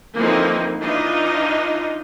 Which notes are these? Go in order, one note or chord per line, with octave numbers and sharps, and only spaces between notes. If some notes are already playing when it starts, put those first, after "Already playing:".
D3 E3 F3 A#3 C4 D#4
E3 D4 D#4 F4